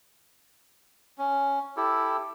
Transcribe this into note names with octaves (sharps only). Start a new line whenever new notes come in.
C#4
E4 G4 A4